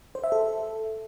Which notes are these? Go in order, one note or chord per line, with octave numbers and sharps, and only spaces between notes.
C5
E5
A4